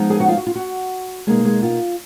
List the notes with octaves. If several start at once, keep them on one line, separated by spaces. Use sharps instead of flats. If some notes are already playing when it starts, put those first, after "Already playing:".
Already playing: F3 G#3 B3 D#4
G#4 G#5
F#4 F#5
F4 F5
F#4
F4
F#4
B2 G#3 A#3 D#4 G#4
G#3 G#4
F4